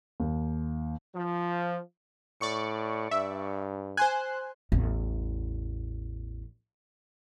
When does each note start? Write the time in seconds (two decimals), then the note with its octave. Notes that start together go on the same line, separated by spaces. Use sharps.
0.20 D#2
1.15 F3
2.41 A2 D5 C#6 C#7
3.11 G2 E5
3.97 C5 G#5 C6 F#6
4.72 A1 E2